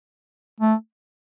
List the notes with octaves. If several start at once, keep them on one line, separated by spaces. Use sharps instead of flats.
A3